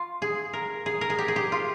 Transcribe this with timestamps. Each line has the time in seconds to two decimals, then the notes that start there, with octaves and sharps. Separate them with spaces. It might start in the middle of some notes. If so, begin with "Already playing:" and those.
Already playing: F4
0.22 G#4
0.53 A#4
0.86 G#4
1.01 A#4
1.10 G#4
1.19 G4
1.28 G#4
1.36 G4
1.52 F4